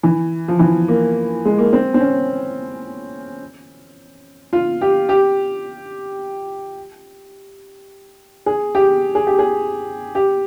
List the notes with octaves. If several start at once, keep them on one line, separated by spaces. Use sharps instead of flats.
E3
F3
E3
A#3
G#3
A#3
C4
C4
C#4
F4
G4
G4
G#4
G4
G#4
G4
G#4
G4